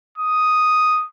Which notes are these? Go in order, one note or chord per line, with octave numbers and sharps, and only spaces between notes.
D#6